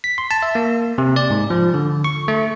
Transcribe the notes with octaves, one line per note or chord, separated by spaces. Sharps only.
B6
C6
A5
E5
A#3
C3
D5
G#2
F3
D3
C#6
A3